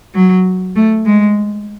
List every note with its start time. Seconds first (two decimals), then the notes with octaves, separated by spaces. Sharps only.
0.14 F#3
0.76 A3
1.05 G#3